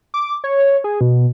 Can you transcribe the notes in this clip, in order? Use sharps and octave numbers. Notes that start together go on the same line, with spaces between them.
D6
C#5
G#4
B2